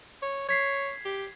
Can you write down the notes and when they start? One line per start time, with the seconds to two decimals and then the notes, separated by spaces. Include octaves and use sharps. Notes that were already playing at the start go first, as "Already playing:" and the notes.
0.22 C#5
0.49 C#5 G#6 B6 C7
1.05 G4